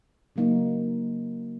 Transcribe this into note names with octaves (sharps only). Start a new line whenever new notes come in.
C#3 F#3 A#3 D#4